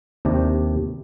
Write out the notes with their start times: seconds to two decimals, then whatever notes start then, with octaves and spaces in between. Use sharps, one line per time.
0.25 D#2 C3 D4 G4